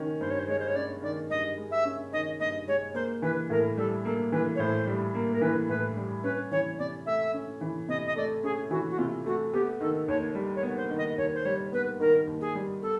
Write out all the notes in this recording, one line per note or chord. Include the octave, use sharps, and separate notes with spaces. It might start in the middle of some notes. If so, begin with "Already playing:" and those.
Already playing: D#3 C#4
G2 C5
C#5
C5
G#3 C#5
C5
C#5
C#4 D5
D#3 D5
G2 D#5
G#3
E5
C#4
D#3 D#5
G2 D#5
G#3 C#5
A#3 C5
E3 B4
A2 A#4
G3 A4
A#3 A4
E3 B4
C#5
A2 C5
G3
A#3
A#4
E3 B4
A2 B4
G3
C#4 B4
E3 C#5
C3 D5
A3 E5
C#4
E3
C3 D#5
D#5
A3 D5
C#4 G#4
E3 F#4
F#4
C3 F4
A3 F#4
B3 G4
D#3 A4
D#2 C#5
G3
C#5
B3
C5
D#3
D#5
D#2 C#5
C5
G3 C#5
B3 B4
D#3 A#4
D#2
G#4
G3
B3 A4